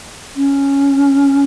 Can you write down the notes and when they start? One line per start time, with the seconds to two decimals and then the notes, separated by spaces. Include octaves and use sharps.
0.36 C#4